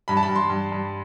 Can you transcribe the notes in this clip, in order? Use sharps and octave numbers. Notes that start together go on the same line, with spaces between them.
G2 B5
A5
B5
G2
C6
G2
G2